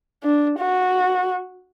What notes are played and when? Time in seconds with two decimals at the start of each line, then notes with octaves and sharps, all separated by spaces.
0.24 D4
0.59 F#4